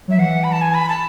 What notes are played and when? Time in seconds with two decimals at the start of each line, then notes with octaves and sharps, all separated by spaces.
0.08 F#3 E5
0.18 E3 F#5
0.44 B5
0.52 A5
0.61 G#5
0.74 B5
0.89 A5